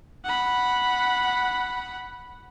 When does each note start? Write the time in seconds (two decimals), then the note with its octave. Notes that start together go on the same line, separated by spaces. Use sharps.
0.25 F#5 B5